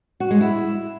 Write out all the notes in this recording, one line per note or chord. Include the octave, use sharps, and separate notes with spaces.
F#4
G#3
E4